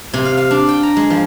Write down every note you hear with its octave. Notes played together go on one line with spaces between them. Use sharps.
C3
F5
F5
D4
G5
A#5
G#3
F3